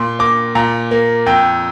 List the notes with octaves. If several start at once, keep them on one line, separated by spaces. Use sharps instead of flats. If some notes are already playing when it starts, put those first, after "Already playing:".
Already playing: A#2 C6
A#3 D6
A#2 A#5
A#3
F2 G5